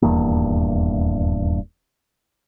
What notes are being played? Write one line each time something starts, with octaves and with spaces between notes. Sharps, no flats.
D#1 E2 G2 A#3